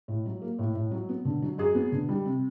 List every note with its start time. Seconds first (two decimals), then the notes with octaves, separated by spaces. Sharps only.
0.08 A2
0.26 F#3
0.42 A#3
0.59 A2
0.75 A2
0.91 F#3
1.09 B3
1.25 D3
1.42 F#3
1.58 F#2 F#4 G#4
1.75 B3
1.92 D3
2.09 G3
2.26 C3